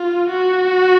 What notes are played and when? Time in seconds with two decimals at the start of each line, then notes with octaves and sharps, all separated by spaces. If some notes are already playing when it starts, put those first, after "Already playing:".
Already playing: F4
0.30 F#4